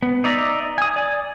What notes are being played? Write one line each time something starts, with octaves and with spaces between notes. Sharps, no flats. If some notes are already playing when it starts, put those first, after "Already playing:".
B3
D#4 D5 E5 A#5
G#5 D#6
D5 G#5